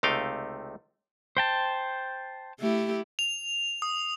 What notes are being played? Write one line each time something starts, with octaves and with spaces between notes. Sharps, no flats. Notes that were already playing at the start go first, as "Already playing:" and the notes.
C#2 C3 A3 D#4 F5 G5
C5 G5 A5
A3 E4 G4
F7
D#6